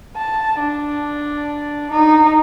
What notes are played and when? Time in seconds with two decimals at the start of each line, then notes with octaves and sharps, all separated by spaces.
0.17 A5
0.59 D4
1.91 D#4